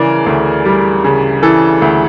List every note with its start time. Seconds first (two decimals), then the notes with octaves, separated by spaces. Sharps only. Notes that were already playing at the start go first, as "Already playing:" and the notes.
Already playing: C#3 E3 A#4 D5
0.26 D2
0.65 G3
1.04 C#3
1.43 E3 A4
1.82 D2